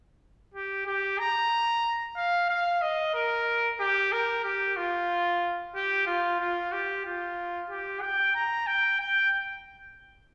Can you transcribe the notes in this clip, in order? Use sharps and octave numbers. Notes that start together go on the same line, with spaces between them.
G4
G4
A#5
F5
F5
D#5
A#4
G4
A#4
G4
F4
G4
F4
F4
G4
F4
G4
G5
A#5
G5
G5